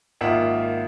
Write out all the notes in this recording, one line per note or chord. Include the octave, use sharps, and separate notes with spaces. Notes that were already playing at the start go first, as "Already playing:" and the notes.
G#1 A#3 F4 E5 F#5